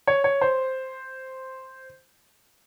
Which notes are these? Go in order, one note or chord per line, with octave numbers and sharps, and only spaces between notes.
C#5
C#5
C5